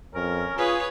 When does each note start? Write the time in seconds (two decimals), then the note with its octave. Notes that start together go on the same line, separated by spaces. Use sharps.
0.14 F2 C#4 A#4
0.58 F4 G#4 B4 C#5